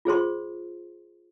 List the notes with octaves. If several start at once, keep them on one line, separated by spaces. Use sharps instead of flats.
F4 G#4 C5 C6